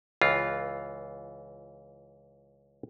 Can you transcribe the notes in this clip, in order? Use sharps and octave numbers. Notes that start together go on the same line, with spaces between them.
C#2 E3 F4